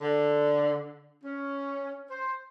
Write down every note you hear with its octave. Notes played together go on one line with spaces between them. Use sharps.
D3
C#4
C5